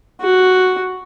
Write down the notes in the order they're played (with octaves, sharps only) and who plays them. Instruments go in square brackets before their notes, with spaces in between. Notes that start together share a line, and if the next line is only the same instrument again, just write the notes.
[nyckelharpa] F#4